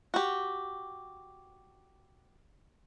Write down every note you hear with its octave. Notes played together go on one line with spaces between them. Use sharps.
F#4 G4